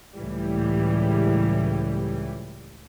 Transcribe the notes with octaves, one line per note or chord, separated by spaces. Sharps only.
C#2 A2 E3 G3